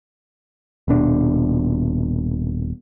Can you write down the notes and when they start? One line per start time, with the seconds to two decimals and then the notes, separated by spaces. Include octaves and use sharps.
0.88 D#1 B2 D4